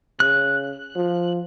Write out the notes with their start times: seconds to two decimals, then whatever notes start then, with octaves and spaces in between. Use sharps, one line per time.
0.20 C#3 F#6
0.96 F3